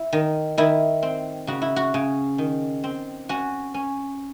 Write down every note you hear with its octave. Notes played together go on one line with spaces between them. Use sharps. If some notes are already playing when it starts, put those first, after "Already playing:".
Already playing: E4
D#3
D#3 E4
C4
C#3 F#4
E4
F#4
C#3
D#3
C4
C#4 F#4
C#4